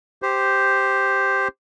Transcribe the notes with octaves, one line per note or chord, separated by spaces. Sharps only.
G4 C5